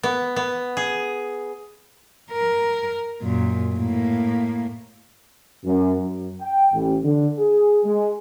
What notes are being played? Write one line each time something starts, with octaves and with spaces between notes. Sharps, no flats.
B3
B3
G#4
A#4
F#2 A#2
A2 A#3
F#2
F#2
G5
A1
D3
G#4
G#3